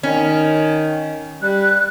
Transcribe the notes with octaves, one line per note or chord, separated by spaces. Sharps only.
D#3 C#4
G3 F#6